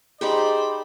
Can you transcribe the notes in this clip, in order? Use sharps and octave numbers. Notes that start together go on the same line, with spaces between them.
D#4 G4 G#4 C5 D5 G5 B5 C6